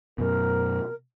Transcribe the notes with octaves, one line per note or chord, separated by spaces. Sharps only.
F#2 B2 A#4